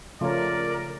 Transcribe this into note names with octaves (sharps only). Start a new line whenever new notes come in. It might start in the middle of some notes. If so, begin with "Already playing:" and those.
C#3 F3 A3 F4 A#4 C#5 D5